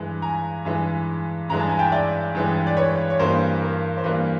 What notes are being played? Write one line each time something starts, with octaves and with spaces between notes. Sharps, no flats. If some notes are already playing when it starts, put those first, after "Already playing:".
Already playing: G2 E3 G#3
G#5 A#5
G2 E3 G#3
G2 E3 G#3 A#5
A5
G#5
G5 A5
D5 E5
G2 E3 G#3
D5
B4 C#5
C#5
G2 E3 G3 A#3 A#4 C5
A#4
C5
G2 E3 G3 A#3 B4